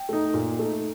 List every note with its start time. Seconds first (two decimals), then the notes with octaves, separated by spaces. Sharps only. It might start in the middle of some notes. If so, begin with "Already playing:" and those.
Already playing: G5
0.09 A3 D#4
0.34 A#2
0.59 A3 D#4